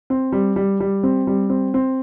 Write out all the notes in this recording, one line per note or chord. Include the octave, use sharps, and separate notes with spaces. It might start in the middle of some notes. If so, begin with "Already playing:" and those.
C4
G3
G3
G3
C4
G3
C4
C4